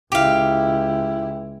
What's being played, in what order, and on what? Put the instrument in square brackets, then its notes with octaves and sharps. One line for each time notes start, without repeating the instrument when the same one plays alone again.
[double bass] C#2 E4 [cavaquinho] G4 F5